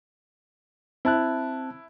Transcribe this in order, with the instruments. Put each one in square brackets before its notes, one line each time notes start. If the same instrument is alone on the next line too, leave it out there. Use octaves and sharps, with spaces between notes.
[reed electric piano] C4 A5 F#6 [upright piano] E4